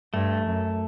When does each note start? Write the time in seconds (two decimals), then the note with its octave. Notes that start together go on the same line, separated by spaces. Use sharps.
0.14 G2 A3
0.47 F#2